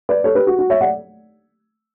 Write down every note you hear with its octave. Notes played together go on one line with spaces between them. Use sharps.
B4 D5
A4 C#5
G4 B4
F#4
F#4
C#5 E5
D5 F#5